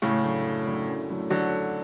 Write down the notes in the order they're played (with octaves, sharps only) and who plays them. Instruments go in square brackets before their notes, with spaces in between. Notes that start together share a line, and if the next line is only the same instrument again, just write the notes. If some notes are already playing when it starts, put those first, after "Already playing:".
[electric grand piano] F#2 [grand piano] A2 C#3
[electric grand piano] D3 F#3 A3 E4
F#2
D3 F#3 A3 E4
F#2
D3 F#3 A3 E4
[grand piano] D3 F#3